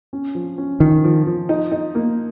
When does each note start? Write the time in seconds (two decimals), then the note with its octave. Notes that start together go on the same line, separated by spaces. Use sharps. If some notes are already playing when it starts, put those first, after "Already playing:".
0.13 C#4
0.35 F3
0.58 C#4
0.80 D#3 F3
1.04 F3
1.27 F3
1.49 D#4
1.72 D#4
1.95 A#3